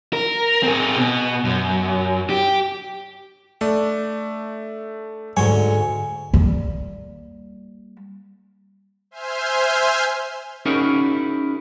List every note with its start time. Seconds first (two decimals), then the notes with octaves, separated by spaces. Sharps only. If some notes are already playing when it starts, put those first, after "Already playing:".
0.13 A#4
0.63 C4 G#4
0.96 B2
1.45 F#2
2.30 G4
3.61 A3 D4
5.37 D2 G#2 F#3 G#3 C#5 G#5
6.34 G3 A#3
9.11 C5 E5 G#5 C6 F6 G6
10.66 C#4 D#4 E4 F#4 G#4 A#4